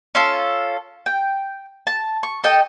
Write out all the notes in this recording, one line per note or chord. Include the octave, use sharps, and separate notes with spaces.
C#4 F4 A4
G5
A5
C#6
A4 D#5 G5 A5